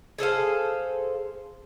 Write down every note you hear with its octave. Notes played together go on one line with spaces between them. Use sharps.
G#4 A4 C5 F5